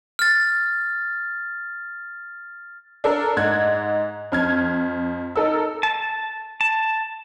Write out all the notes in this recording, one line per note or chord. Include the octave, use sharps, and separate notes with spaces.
F6 A6
D4 A4 A#4
G#2 F#6 G#6
F2 F6 G#6
D#4 A4 A#4 E6
A5
A5